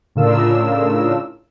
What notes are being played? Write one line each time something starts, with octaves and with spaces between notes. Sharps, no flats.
A2 C#3 D4 F4 A#4 E6